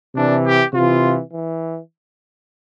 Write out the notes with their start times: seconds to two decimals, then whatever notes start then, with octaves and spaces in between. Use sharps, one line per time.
0.15 C3 E3 D4
0.44 G4
0.73 C3 E3 F4
1.31 E3